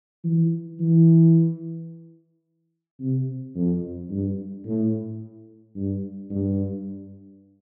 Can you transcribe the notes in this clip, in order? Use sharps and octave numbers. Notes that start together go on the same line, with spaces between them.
E3
E3
C3
F2
G2
A2
G2
G2